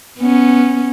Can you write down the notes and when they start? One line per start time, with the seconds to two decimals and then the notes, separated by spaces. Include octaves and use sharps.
0.19 B3 C#4